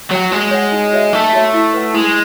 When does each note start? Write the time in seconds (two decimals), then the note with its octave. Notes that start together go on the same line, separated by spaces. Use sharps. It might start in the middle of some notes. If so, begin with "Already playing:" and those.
0.11 F#3 C#5 F#5
0.31 G#3 F#4
0.51 C#5 F#5
0.72 D#4
0.93 F#4 C#5 E5
1.13 A3 D#4
1.33 F#4 C#5 E5
1.53 E4
1.74 B4 F#5
1.94 G#3 E4